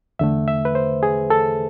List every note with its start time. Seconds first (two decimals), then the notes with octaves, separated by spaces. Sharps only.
0.19 E2 D3 A3 E5
0.48 E5
0.65 B4
0.75 C5
1.03 G#4
1.30 A4